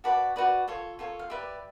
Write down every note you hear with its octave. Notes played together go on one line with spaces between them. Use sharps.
F#4 B4 D5 A5 B5
F#4 B4 D5
F4 A4 C#5
F4 A4 C#5
F5
G4 B4 D5 E5